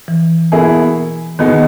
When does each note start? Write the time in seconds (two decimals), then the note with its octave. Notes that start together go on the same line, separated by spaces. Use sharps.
0.08 E3
0.52 B2 A#3 E4 G#4
1.39 B2 D#3 G#3 B3 D#4